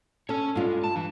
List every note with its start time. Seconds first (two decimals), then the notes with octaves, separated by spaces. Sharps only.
0.29 C#4 A4 C#5
0.55 G2 G#3 F4
0.84 A5
0.96 E3